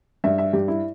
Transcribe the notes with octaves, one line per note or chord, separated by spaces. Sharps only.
G2 E5
E5
G2 G4
E4